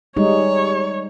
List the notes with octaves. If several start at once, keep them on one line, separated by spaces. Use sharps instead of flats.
G3 G#3 D#4 C#5